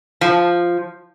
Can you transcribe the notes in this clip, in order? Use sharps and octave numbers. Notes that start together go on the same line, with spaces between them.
F3